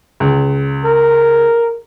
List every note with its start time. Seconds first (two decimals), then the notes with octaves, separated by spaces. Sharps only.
0.20 C#2
0.85 A#4